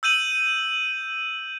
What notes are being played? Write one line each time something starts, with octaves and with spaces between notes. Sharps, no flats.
E6 G6 D#7 F#7